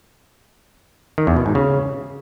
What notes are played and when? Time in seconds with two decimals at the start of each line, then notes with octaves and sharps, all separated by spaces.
1.18 D#3
1.27 E2
1.37 B2
1.46 G#2
1.55 C#3